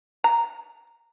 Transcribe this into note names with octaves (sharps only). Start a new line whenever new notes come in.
A#5